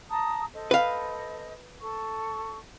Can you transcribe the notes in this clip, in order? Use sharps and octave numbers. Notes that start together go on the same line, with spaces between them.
A5 A#5 D#6
A4 C5 D#5
B4 F5
A4 C#6